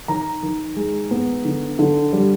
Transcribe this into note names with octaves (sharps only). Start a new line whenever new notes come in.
D#3 A#5
D#3
G#3
B3
D3
D3
G3